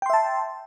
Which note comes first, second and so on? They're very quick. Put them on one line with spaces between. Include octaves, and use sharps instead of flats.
G5 C6 E5 A5